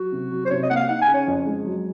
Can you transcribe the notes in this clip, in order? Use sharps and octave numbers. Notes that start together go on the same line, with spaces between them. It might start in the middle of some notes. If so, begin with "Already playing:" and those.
Already playing: F#3 F#4
C3
F#3
C5
C3 C#5
D#5
A#3 F#5
F5
D#4 F#5
G#5
C#3
C#5
F2
G#3
F#3